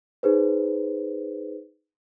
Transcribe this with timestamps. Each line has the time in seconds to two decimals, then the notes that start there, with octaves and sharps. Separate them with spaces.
0.23 D#4 G#4 B4 C5